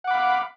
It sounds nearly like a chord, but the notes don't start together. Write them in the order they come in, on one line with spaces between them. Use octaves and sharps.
F#5 D6 B5 F5